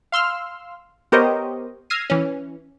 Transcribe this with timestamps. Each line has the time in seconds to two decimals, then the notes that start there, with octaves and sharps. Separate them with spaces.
0.12 F5 C6 E6 F6
1.12 B3 G4 A#4 C5 C#5 D#5
1.90 E6 F6 G#6 A#6 C7 D#7
2.10 E3 C#4